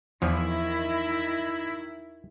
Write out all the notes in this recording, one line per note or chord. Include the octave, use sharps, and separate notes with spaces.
E2 D#3 F3 E4